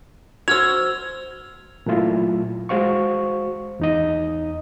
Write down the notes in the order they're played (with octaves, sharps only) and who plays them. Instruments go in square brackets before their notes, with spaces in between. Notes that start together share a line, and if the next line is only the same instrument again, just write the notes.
[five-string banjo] F#4 C5 [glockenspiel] E6 F6 F7 [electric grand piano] G#6
[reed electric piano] A#2 F#3 A3 E4 F4
G#3 F#4 C5 F5 C#6
E2 D#4 D#5